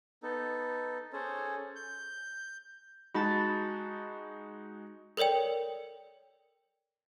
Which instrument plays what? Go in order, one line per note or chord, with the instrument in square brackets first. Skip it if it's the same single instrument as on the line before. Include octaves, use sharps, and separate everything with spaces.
[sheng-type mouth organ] B3 D#4 A4
C#4 G#4 A4 C5
G6
[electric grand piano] G#3 D#4 F#4 [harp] A5 B5
[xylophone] A4 A#4 C#5 D5 G5